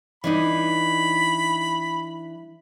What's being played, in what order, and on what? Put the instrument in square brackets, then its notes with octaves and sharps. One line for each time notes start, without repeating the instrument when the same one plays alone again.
[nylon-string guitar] E3 D4 D#4 [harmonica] B5